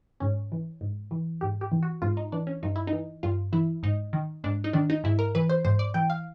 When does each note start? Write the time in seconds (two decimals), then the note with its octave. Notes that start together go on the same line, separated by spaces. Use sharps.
0.20 G#2 C#4
0.52 E3
0.81 G#2
1.11 E3
1.41 G#2 G4
1.61 G4
1.72 E3
1.83 F#4
2.02 G#2 F4
2.17 D#4
2.32 E3 D4
2.47 C#4
2.63 G2 D#4
2.76 E4
2.87 D#4
2.93 E3
3.23 G2 F4
3.53 E3 E4
3.83 G#2 D#4
4.13 D#3
4.44 G#2 D4
4.64 D#4
4.73 D#3 D4
4.90 D#4
5.04 G#2 E4
5.19 A#4
5.35 E3 B4
5.49 C5
5.65 G#2 C5
5.79 D5
5.94 E3 G5
6.10 F5